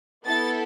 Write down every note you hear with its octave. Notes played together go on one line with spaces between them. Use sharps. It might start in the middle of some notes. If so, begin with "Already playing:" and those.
B3 E4 A4 A6